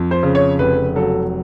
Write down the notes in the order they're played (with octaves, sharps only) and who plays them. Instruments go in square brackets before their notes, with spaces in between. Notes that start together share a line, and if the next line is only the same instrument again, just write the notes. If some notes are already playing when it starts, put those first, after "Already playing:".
Already playing: [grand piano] F2
C5
C#3
C#5
F1 B4
F#3 A4